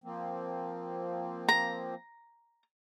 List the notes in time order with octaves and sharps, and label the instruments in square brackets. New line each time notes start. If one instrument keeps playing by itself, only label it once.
[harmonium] F3 A#3 C4
[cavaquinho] A#5